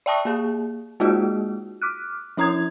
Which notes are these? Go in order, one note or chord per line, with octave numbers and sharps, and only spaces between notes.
D5 E5 G5 A5 C#6 D#6
A#3 G#4
G#3 A#3 D#4 F4 F#4 G#4
D6 F6 F#6
F3 C#4 E4 A#5 D#6 G#6